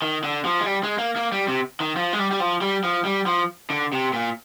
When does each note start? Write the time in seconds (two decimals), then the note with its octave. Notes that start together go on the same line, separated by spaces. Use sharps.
0.02 D#3
0.24 D3
0.45 F3
0.60 G#3
0.66 G3
0.83 G#3
0.98 A#3
1.16 A#3
1.32 G3
1.48 C3
1.80 D#3
1.96 F3
2.13 G#3
2.19 G3
2.31 G3
2.40 F3
2.62 G3
2.84 F3
3.05 G3
3.26 F3
3.70 D3
3.93 C3
4.13 A#2